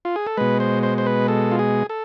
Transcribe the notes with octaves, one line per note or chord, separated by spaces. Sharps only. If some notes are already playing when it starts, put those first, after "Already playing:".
F4
G#4
A4
B2 G#3 B4
C5
C5
C5
B4
A4
F4
G#4
A4